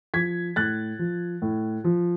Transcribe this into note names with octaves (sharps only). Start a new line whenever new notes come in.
F3 G#6 B6
A2 F#6 A6
F3
A2
F3